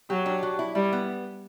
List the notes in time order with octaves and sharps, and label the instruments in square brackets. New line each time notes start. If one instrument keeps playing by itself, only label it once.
[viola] F#3 [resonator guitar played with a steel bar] G4
[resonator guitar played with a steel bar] D4
F#3
E4
[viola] G3 [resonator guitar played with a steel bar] E4
[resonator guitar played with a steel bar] B3